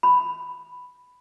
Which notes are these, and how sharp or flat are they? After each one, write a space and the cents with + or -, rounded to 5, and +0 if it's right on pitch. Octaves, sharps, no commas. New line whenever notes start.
B5 +5